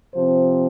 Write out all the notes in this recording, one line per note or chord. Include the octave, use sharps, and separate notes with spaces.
C3 F3 C4 C5